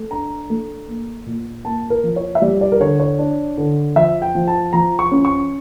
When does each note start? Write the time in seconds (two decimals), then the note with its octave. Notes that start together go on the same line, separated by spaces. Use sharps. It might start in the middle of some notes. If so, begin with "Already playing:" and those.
Already playing: A3
0.10 D4 A#5
0.50 A3
0.88 A#3
1.26 A#2
1.65 A#3 A5
1.90 A#4
2.04 F3
2.16 C#5
2.35 E5
2.42 G3 D5
2.61 D5
2.72 A#4
2.80 D3 C#5
3.00 C#5
3.19 D4
3.58 D3
3.96 F3 E5
4.22 G5
4.35 F3
4.48 A5
4.73 F3 A#5
4.99 C#6
5.11 C#4
5.25 C#6